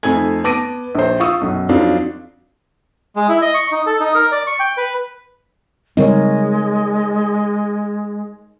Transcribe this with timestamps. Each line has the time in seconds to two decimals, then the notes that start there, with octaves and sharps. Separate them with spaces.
0.03 F2 A3 D#4 G#5 G#6
0.44 B3 A5 D6 A#6 D7 D#7
0.95 A#1 C5
1.20 F4 C#6 D#6 E6
1.41 B1 F#2
1.69 F2 F#3 D4 D#4 F4 F5
3.16 G#3
3.29 E4
3.42 D#5
3.54 C#6
3.71 D#4
3.87 A4
4.00 D#4
4.15 A#4
4.32 D5
4.47 C#6
4.60 G5
4.78 B4
5.97 C#3 G3 G#3 C4 D#4 A#4 C#5